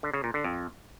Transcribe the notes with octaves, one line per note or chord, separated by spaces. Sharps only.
D3
C#3
A#2
D3
F2